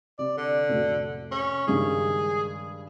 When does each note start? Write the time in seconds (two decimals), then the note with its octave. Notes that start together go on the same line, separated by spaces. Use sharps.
0.19 C3 D5
0.38 D3
0.69 F1 A2 F#4
1.31 C#4
1.67 C#2 G2 D#3 G#4